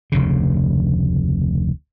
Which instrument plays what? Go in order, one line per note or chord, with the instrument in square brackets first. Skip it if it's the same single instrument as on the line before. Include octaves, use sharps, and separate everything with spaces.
[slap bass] F1 D2 C#3